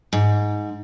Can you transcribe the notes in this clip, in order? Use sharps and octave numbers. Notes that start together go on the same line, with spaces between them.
G#2